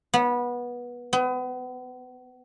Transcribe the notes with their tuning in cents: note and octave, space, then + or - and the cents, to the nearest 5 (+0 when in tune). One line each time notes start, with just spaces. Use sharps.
B3 -20
B3 +35